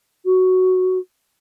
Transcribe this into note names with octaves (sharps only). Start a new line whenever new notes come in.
F#4